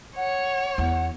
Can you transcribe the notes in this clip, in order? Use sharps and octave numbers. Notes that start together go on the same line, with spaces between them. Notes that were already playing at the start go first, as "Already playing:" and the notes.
C#5 F#5
E2 F#5